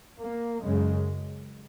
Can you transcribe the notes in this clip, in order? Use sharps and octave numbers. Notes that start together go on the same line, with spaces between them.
A#3
F#2 C#3 G#3